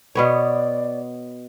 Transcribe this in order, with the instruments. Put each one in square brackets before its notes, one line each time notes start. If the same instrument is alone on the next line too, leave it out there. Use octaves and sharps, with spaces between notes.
[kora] B2 B3 C#5 [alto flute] D5